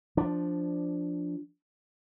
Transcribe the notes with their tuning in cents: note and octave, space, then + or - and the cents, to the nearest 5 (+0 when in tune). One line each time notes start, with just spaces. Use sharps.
F3 +0 D4 +0